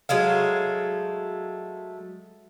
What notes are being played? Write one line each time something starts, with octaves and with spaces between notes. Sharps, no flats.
F#3 G#3 A3 F5